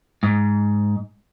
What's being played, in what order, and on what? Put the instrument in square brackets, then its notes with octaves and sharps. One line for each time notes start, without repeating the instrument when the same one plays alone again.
[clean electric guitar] G#2